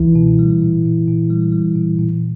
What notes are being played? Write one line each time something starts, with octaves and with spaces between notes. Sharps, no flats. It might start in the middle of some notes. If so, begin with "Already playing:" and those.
Already playing: C#2 E3 E4
B2
G3
A#2
A#2
A#2
G3
G3
A#2
A#2